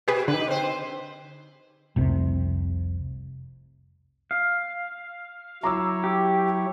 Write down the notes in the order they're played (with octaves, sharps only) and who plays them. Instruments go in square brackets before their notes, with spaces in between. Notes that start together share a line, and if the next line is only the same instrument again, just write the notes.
[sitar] B2 [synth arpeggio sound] G4 G#4 B4
[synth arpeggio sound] D3 [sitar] D#4 G4 B4
[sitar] C4 C5
[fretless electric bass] F1 C2 C3
[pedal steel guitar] F5
[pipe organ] F#3 E4 C#5 [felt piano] A#5 D6 E6
[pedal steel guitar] G4